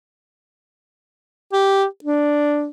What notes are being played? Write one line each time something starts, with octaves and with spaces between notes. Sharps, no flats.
G4
D4